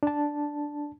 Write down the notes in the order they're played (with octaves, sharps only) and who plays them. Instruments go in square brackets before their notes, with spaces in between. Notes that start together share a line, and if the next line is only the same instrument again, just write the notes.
[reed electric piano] D4 A5